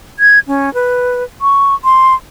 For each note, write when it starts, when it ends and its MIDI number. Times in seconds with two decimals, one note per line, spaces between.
0.19 0.39 92
0.47 0.72 61
0.74 1.24 71
1.41 1.74 85
1.84 2.14 84